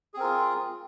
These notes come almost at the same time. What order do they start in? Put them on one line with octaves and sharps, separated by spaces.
G#4 C4 A#4 F4